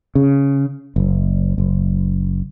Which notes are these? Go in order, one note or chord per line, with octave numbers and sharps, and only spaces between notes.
C#3
F#1
F#1